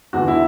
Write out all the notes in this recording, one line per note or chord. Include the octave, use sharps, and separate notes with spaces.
E2 D3 F#4
E4